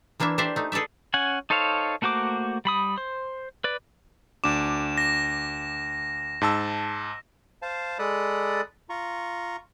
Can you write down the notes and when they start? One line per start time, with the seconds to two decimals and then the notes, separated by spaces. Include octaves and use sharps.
0.20 E3 A#3 D4 E4 E5
0.38 D4 G4 C5 D5 E5
0.56 A3 D#4
0.72 G#4 A4 B4 D5 E5
1.14 C#4 F#5 G#5
1.50 D#4 A4 C5 C#5 F5
2.02 A3 A#3 F#4 C5 D6
2.65 G3 B5 D#6
2.98 C5
3.64 B4 D5
4.44 D2 D4 D6 E7
4.98 A#6
6.41 G#2 A5 E6
7.62 C5 F5 A5
7.99 G#3 A4 D5 B5 D#6 F#6
8.89 F4 A#5 C#6